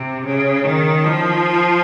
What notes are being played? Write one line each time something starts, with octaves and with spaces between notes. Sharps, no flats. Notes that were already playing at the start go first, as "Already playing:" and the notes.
Already playing: C3
C#3
D#3
F3